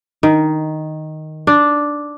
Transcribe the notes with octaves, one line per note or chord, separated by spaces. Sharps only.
D#3
D4